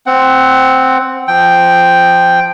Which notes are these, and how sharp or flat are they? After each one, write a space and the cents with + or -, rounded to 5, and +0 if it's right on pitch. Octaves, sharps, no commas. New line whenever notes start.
C4 +0 F#5 +15
F3 -10 G5 +0